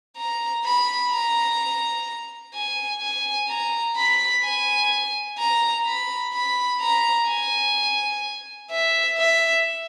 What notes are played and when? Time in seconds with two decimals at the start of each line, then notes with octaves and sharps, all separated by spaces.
0.17 A#5
0.65 B5
1.11 A#5
2.54 G#5
3.01 G#5
3.49 A#5
3.96 B5
4.43 G#5
5.38 A#5
5.86 B5
6.33 B5
6.81 A#5
7.28 G#5
8.71 E5
9.18 E5